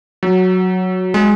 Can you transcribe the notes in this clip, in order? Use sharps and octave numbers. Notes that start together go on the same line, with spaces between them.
F#3
G#3